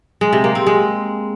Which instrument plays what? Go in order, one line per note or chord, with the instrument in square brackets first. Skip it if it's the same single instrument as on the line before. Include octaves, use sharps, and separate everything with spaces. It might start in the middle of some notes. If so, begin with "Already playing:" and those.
[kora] G#3
C3
A#3
C4
G#3